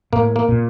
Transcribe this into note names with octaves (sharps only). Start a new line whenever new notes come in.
A2 A#3
A#3
A#2